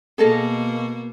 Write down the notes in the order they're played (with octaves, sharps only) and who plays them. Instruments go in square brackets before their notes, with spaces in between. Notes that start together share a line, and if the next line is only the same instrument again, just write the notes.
[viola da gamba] B2 A#3 [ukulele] G#4 A4 D#5